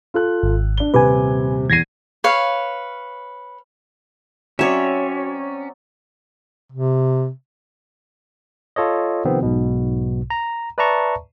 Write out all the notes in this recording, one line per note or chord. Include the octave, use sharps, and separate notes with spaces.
F4 A4 F#6
G#1
D4 G7
D#1 C3 B4 G#5 D6
E2 G#6 A#6 C7 D#7
B4 C#5 F5
F#3 C4 C#4 F#4 C#5 D5 E5
C3
F4 A4 C#5 D#5
C3 D#3 F3 B3 C4
B1 G#2 B2
A#5
B4 D5 E5 A5 A#5 C#6